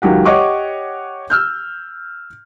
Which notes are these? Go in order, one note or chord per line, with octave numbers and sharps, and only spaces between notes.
C#2 D#3 F#3 G4 F#5
G4 C#5 D#5 F#5 C#6 D6
E6 F6 G6